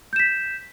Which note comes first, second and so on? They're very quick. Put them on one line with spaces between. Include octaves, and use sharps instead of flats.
G6 E7 B6